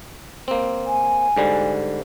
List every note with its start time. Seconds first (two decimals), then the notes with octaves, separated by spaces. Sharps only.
0.48 A#3 C4
0.86 G#5
1.37 G#2 D3 G3